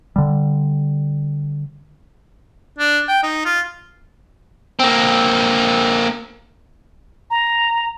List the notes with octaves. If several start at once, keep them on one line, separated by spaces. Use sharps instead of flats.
D3 G3
D4
G5
D#4
F4
A#3 C4
A#5